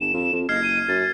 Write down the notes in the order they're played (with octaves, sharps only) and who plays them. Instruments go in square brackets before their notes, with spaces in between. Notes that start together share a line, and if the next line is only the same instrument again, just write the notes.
[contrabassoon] G1 [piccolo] E7
[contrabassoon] F2
F2
[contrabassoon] F#1 [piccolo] D#5 [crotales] F6 G#6 C7
[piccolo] D#7
[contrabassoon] F#2 [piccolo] A6